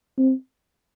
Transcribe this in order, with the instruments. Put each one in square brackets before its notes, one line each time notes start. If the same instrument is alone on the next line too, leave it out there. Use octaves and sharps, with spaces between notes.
[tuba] C4